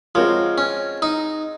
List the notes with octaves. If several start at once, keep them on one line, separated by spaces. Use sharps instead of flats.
F3 G#3 C4 F#4 A#4 C#5
C#4
D#4